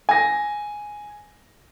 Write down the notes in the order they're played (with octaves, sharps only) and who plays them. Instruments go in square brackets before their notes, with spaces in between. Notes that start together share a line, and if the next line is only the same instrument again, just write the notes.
[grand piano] G#5 A#6